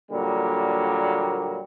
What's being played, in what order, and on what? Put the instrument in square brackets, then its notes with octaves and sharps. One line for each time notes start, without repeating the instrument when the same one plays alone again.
[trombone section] A#2 D3 F#3 G3 A#3